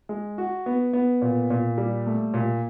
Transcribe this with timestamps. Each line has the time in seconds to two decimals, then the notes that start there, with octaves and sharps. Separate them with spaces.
0.09 G#3
0.38 F#4
0.66 B3
0.93 B3
1.22 A#2
1.50 A#2
1.78 G3
2.06 A3
2.34 A#2